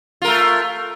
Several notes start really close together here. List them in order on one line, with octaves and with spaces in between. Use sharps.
F4 A#4 A3